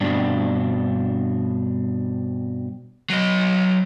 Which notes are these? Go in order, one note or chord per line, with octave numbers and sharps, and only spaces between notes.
G2 B2 C4 D4
F#3 D#5